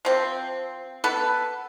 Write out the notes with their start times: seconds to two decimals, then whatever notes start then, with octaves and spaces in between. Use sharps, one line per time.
0.05 F3 C4
1.04 B3 A4 B4